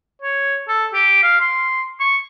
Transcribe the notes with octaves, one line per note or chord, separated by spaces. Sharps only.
C#5
A4
G4
F5
C6
C#6